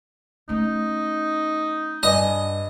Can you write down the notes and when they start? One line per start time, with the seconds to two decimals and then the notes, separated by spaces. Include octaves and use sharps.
0.49 A3 C#4 D#4
2.03 G2 D#5 G#5